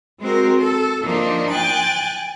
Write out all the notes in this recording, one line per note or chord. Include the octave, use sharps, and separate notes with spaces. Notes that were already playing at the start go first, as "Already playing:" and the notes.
G#3 C4 F#4 A#4 C5
A4
F3 A#3 D4 D#4
G5 G#5 F#6 A6